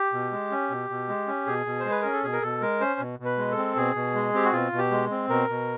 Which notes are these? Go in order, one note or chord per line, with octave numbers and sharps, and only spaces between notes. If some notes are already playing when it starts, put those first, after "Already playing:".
Already playing: G4
B2
G#3
C#4
B2
B2
G#3
C#4
B2 G#4
B2
C5
G#3
B4
C#4 A#4
A4
B2 G#4
A#4
B2 A4
G#3 A#4
C#4 C5
B2
B2
B4
G#3
A4
C4
B2 G#4
B2
G#3
C4 G4
F#4
B2 F4
B2
G4
G#3
C4
B2 A#4
B2